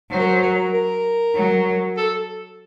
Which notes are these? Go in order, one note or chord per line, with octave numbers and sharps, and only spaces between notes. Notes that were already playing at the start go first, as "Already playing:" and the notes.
F#3 C5
A#4
C5
A#4
A#4
F#3
A4